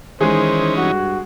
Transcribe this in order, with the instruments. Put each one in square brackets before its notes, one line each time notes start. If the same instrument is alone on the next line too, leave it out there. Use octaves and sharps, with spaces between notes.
[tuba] D#3 [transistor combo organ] E3 C#4 D#4 [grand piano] G#3 G#4 [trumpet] C5
[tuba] G2 [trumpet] F#4